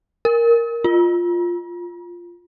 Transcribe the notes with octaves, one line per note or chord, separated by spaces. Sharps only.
A#4
F4